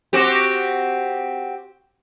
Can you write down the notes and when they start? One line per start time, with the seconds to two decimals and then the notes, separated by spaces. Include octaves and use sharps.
0.13 C4 F#4 G4